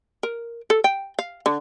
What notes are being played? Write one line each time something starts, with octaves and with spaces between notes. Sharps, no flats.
A#4
A4
G5
F5
D3